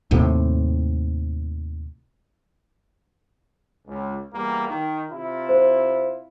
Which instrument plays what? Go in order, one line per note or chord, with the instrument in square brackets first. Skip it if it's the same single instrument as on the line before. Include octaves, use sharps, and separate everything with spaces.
[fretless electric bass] D#2 A2 C3
[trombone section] C#2
E2 G3 A#3
D#3
C3 E4 F4
[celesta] C5